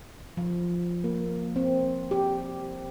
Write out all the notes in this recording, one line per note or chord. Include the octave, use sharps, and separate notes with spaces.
F3
A#3
C4
G4